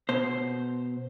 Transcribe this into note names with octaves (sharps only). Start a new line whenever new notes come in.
B2 C5